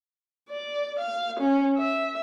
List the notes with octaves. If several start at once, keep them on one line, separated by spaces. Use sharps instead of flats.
D5
F5
C#4
E5